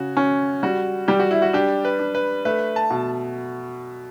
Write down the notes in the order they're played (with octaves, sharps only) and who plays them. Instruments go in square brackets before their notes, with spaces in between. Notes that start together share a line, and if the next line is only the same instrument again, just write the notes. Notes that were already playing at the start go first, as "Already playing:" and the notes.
Already playing: [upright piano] C#3 [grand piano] F#4
[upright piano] C#4
[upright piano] G3 [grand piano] F#4
[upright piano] G3 [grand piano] G4
[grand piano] F#4
E4
F#4
[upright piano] D4 [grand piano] G4
[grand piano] B4
[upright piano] D4
[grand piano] B4
[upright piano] A3 [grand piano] B4
[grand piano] A5
[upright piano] B2